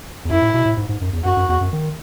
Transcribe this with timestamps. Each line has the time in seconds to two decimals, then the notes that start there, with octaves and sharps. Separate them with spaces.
0.25 E2
0.30 F#2 E4
0.42 A2
0.54 B2
0.65 A2
0.77 G#2
0.89 G#2
1.01 F#2
1.13 E2
1.24 F#2 F#4
1.37 F#2
1.49 E2
1.61 F#2
1.73 D#3